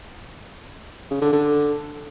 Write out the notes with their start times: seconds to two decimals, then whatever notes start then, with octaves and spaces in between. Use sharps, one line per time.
1.11 C#3
1.22 D3
1.33 D3